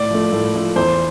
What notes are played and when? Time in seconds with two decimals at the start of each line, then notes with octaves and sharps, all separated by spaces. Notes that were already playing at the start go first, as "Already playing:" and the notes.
Already playing: A2 D5
0.11 F3 A3
0.32 A2
0.54 F3 A3
0.76 E2 C5